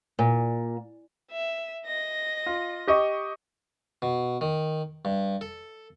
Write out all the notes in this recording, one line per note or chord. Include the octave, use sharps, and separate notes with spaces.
A#2
E5
D#5 A#6
F4
G4 D#5 C#6
B2
D#3
G2
A4